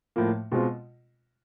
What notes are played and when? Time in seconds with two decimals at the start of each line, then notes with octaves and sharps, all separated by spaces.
0.16 A2 F3 A#3
0.52 B2 G#3 C4 F4